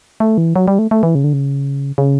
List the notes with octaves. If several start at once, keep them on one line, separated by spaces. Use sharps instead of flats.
A3
E3
F#3
G3
A3
A3
E3
C#3
D3
C#3
C#3